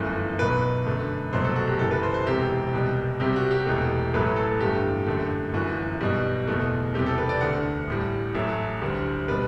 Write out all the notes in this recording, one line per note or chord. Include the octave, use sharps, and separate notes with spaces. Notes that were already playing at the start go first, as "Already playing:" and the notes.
Already playing: G1 F#2 E3 A3
B1 B2 F#3 B4
F#2 D3 A3
C2 B2 F#3 A3 C5
A4
F#4
G4
F#1 F#2 E3 A4
B4
C5
C5
E1 E2 C3 G4
C2 B2 G3
C2 C3 G3 G4
F#4
G4
E1 E2 B2 A3
A1 A2 F#3 A3 B4
A4
G1 G2 E3 A3 G4
F#2 D3 A3
G1 F#2 E3 F#4
B1 B2 G3
F#1 E2 B2 A3
E2 C3 G3 G4
A4
B4
D5
D2 D3 A3 F#5
A1 A2 G3
A1 A2 F#3 A3 E5
D2 D3 G3
B2 G3 B4